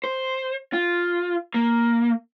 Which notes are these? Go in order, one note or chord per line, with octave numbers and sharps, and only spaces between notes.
C5
F4
A#3